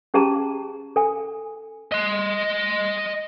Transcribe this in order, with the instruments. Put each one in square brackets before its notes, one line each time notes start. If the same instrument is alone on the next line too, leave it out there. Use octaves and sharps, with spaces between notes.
[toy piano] C#4 G4 G#4 A5 A#5
A4 G#5
[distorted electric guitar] D#5 C6